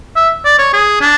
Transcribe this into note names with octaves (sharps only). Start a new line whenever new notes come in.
E5
D5
C#5
G#4
D4